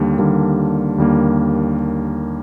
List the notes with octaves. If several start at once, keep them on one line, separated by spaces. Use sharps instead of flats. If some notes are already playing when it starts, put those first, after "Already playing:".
Already playing: D#2 D3 G3 A#3
D#2 D3 G3 A#3
D#2 D3 G3 A#3